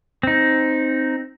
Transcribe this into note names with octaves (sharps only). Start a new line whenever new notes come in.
C4 D#4